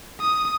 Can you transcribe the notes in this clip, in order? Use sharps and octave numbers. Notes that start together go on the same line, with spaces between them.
D#6